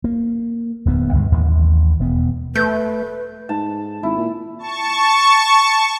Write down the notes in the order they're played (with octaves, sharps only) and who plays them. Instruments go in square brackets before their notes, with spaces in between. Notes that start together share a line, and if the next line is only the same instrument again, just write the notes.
[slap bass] A#3
D1 D#2 B3
C#2 G2 D3 G#3
A1 D#2
E1 B3
[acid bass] A3 [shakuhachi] B4 [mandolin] G6
[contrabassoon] G#2 [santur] A5
[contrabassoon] G#1 [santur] E4
[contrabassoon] A#2
[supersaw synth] A5 C#6